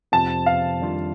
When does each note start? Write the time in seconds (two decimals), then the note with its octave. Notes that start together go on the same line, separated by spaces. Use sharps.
0.12 F2 C3 F3 C4 A5
0.46 F5
0.80 F2 D#3 G3 D4 F4